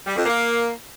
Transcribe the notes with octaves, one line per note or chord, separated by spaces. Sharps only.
G3
F2
A#3